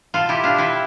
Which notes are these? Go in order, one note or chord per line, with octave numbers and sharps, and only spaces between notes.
B2 F4 A4
E4 G4
B2 D4 F4
C4 E4